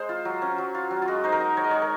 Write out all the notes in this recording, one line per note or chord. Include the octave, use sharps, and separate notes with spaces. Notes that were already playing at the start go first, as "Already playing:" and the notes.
Already playing: G#3 C5
F4
F#3
C#4
F#3
F4
F#3
F4
G#3 F#4
D#4 C5
A#4
D#4
G#3 C#5
D#5
G#3 C#5
A#4